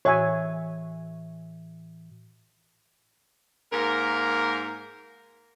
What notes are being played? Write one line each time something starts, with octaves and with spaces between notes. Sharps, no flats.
A2 E3 F#4 C#5 E5 G#5
G#2 A#3 A#4